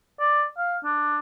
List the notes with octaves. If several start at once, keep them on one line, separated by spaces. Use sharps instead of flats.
D5
F5
D4